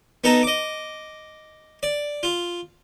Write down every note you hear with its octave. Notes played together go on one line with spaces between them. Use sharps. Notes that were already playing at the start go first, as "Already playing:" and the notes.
B3 D#4 A4 A#5
D#5 D6
D5
F4